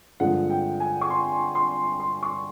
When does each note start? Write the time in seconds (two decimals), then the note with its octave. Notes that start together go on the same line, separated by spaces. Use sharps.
0.20 G2 D3 F3 G#3 F#5
0.50 G5
0.80 G#5
1.01 C#6
1.10 C6
1.55 C6
2.00 C6
2.23 C#6